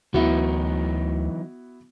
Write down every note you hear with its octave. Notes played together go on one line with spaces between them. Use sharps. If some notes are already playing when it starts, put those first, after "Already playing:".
D2 E3 F#3 B3 D#4 E4 F#4